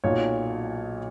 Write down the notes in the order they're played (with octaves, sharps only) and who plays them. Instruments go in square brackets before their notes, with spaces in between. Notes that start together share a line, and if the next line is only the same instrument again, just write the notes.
[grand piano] B1 A#2 F#3 C#5